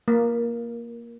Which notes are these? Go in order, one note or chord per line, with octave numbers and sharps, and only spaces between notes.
A#3